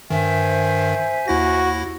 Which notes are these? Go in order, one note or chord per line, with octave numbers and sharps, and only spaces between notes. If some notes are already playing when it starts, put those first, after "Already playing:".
G2 D#3 C5 E5 G#5
D#2 E4 F#4 A#6